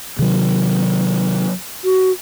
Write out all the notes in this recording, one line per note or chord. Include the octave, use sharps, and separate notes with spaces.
C3 D#3 F#3
F#4